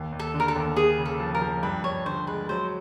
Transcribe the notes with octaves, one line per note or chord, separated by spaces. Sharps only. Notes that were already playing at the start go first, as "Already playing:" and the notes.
Already playing: D#2
D#2
A4
D3
A#4
A4
D#2
A#3 G#4
C#3
A4
F3
A#4
F3
G2 B4
G2 C#5
D3 C5
G#3 B4
F#3 C5